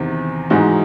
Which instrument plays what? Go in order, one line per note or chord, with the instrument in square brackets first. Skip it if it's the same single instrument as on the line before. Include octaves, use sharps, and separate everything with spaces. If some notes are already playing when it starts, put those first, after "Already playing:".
Already playing: [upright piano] E2 C3 D#3
G#2 E3 G#3 D#4 F#4